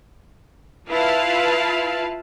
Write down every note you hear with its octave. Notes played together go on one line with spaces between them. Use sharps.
E4 F4 B4 F5 A5